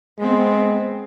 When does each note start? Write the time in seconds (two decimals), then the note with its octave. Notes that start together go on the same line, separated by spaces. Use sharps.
0.19 G#3 B3 C4